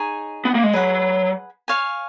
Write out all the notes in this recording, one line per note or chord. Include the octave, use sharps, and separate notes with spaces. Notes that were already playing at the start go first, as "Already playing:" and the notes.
Already playing: D#4 G#4 C#5 G#5
B3
A#3
G#3
F#3 G#4 B4 F#5 B5
C#5 F5 G#5